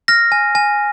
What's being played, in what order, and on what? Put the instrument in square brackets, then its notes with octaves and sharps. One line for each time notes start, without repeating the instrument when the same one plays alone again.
[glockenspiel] F6 A#6
G#5
G#5